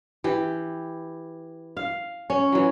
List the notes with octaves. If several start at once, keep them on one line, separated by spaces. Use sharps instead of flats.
E3 G4
F5
C#4
E3 F#3